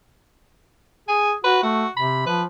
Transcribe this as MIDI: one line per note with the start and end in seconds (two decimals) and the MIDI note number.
1.08 1.33 68
1.08 1.31 80
1.44 1.59 66
1.44 1.59 71
1.63 1.85 57
1.63 1.90 66
1.97 2.22 48
1.97 2.23 83
2.27 2.45 53
2.27 2.42 71